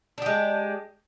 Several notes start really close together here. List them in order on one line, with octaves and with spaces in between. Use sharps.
D4 G4 G#3